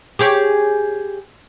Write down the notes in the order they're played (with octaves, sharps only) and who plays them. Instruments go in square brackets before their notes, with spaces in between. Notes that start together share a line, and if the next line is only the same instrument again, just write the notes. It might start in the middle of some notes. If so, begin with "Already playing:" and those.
[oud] G4 G#4 C#5